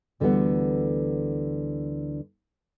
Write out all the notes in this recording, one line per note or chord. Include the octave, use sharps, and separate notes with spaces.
D2 D3 E3 G3 B3 F#5